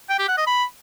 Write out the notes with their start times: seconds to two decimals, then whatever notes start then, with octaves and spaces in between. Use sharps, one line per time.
0.09 G5
0.19 G4
0.28 F#5
0.37 D#5
0.47 B5